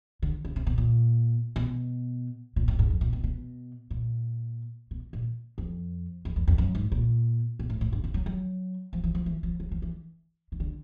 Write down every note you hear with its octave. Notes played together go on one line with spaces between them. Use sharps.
D3
C#3
C3
B2
A#2
B2
A#2
A2
G#2
F2
A#2
B2
B2
A#2
B2
A#2
F2
F2
E2
F2
F#2
G#2
A#2
B2
A2
A2
G2
C#3
F#3
F#3
F3
E3
F3
E3
F3
F#3
F3
E3
D#3
D3